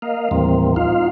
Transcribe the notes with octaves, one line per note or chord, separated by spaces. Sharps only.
A#3 D#5 F5
D#2 A2 E3 G3 A#3 C4
D#4 F4 F5